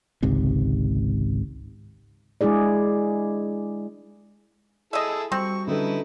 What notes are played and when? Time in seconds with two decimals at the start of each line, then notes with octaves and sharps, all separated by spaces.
0.23 G#1 C#2 G#2 C3
2.41 G#3 D4 E4 G#4 D5
4.93 E4 G#4 A4 D#5 E5
5.32 G3 C4 F#4 C#6
5.68 D3 G3 C#4 D#4 E4 A4 B4